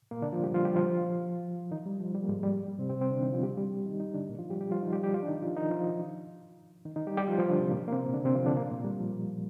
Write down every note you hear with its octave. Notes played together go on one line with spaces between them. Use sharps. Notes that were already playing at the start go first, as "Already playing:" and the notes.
A#2 A#3
D3 D4
F3 F4
G3 G4
F3 F4
G3 G4
F3 F4
D#3 D#4
G3
F3
G3
A#3
G#2 G#3
G3
G3
C3 C4
C3 C4
C4
D3 D4
D#3 D#4
F3 F4
G3 G4
G3 G4
D#3 D#4
D#3 D#4
D3 D4
A#2 A#3
F3 F4
G3 G4
G3 G4
F3 F4
D#3 D#4
G3 G4
G3 G4
F3 F4
D4
D#3 D#4
F3 F4
D#3 D#4
F3 F4
D#3 D#4
D#3 D#4
G3 G4
G3 G4
F3 F4
F3 F4
D3 D4
C3 C4
A#2 A#3
A#3
C3 C4
D3 D4
C3 C4
F3 F4
D3 D4
A#2 A#3
A#2 A#3
G3
F3